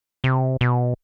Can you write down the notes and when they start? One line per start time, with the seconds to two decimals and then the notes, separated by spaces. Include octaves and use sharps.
0.24 C3
0.61 B2